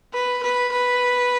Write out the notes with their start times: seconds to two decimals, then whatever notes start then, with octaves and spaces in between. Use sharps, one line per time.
0.13 B4
0.43 B4
0.72 B4